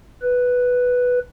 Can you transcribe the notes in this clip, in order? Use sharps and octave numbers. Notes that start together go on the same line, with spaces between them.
B4